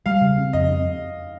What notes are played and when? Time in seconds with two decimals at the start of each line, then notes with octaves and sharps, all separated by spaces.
0.06 G3 F5
0.22 C#3
0.38 C4
0.53 F2 D#5
0.69 C4